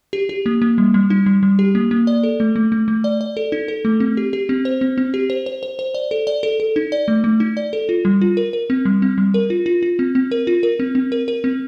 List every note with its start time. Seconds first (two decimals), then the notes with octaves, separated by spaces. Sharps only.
0.13 G4
0.29 G4
0.46 A#3
0.62 A#3
0.78 G3
0.94 G3
1.10 D#4
1.26 G3
1.43 G3
1.59 G4
1.75 A#3
1.91 A#3
2.07 D5
2.23 A4
2.40 A3
2.56 A3
2.72 A3
2.88 A3
3.04 D5
3.21 D5
3.37 A4
3.52 D#4
3.68 A4
3.85 A3
4.00 C4
4.17 G4
4.33 G4
4.49 C4
4.65 C5
4.81 C4
4.98 C4
5.14 G4
5.30 C5
5.46 C5
5.63 C5
5.79 C5
5.94 D5
6.11 A4
6.27 D5
6.43 A4
6.60 A4
6.76 D#4
6.92 D5
7.08 A3
7.24 A3
7.40 D#4
7.57 D5
7.73 A4
7.89 F4
8.05 G3
8.21 F4
8.37 A#4
8.53 A#4
8.70 C4
8.85 G3
9.02 C4
9.18 G3
9.34 A#4
9.50 F4
9.66 F4
9.83 F4
9.99 C4
10.15 C4
10.32 A#4
10.47 F4
10.63 A#4
10.80 C4
10.95 C4
11.12 A#4
11.28 A#4
11.44 C4